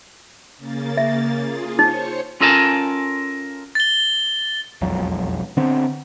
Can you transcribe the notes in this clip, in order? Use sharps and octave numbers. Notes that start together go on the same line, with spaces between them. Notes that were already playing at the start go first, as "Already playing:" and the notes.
C#3 A#3 A6
E5
F4 G#4
D#4 C5 C#5 C#6
C#4 F4 A4 A#4 G#5 A5
A6 G7
E1 B1 F2 F#3
D3 B3 C4